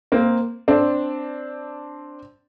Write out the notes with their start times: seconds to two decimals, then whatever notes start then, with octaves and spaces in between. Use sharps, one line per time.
0.12 A#3 C4
0.68 C4 D4